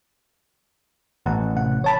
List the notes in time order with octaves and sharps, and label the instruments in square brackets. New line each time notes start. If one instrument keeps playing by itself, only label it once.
[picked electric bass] A1 [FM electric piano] F#5
[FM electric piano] C3 F#5
C#5 A5 B5